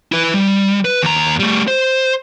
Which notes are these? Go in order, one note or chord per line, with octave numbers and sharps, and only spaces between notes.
E4 B4
G3
B4
D#2 A#5
G3 A3
C5